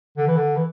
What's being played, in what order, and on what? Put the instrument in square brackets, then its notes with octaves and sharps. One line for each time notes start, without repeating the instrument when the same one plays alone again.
[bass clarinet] D3
E3
D3
E3